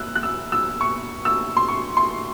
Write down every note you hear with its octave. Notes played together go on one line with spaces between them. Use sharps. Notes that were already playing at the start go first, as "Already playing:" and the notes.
Already playing: E6 F#6
F#6
E6
E6
C#6
E6
C6
C#6
C6